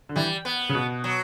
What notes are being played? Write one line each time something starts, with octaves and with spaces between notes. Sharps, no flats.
D3
E3 G3
B3
C#3
B2
F#3